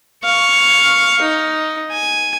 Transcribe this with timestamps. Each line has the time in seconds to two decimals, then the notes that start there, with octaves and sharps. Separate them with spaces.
0.24 F5 C#6
1.22 D#4
1.91 G#5